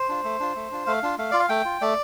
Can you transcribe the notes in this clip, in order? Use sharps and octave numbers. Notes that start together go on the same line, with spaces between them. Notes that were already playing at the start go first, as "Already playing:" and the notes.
Already playing: C5
D4 F4
A3
D4 F4
A3
D4 F4
A3 F5
D4 F4
A3 F5
F4 D5
F5
A3 G5
F4
A3 D5